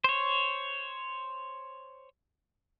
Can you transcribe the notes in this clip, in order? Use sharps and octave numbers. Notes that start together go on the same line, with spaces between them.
C5 C#5